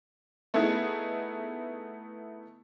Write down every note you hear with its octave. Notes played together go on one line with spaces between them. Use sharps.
A3 B3 D#4 E4 G#4